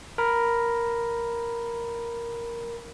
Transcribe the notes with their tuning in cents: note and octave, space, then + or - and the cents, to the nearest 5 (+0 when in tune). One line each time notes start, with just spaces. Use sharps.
A#4 +5 B5 +0